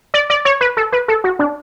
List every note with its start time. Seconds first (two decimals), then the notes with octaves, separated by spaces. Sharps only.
0.14 D5
0.30 D5
0.45 C#5
0.61 B4
0.77 A4
0.92 B4
1.08 A4
1.24 F#4
1.39 D4